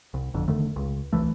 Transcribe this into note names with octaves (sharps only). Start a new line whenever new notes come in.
C2
G1 F2 D3
E1 D3 D#3 A3
C#2
D1 C2 E3 A3